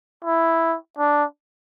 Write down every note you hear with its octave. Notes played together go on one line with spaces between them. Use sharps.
E4
D4